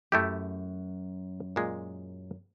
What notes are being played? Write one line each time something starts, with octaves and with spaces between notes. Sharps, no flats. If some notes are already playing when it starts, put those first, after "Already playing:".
F#2 A3 E4 G4
A#2 G#3